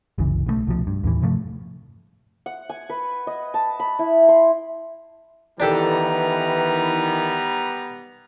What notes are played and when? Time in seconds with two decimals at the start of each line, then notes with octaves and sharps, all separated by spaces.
0.18 F#1 C2 C#3 E3
0.46 B1 D#3 A3
0.67 C2 B2 F3
0.87 G2
1.04 D#2 A2 E3
1.22 G2 C3 F3 A3
2.46 F#5
2.69 G#5
2.90 B4
3.27 D#5
3.54 A5
3.80 B5
3.99 E4
4.29 C6
5.60 D#3 E3 G3 B3 D4 G4 A4 A#5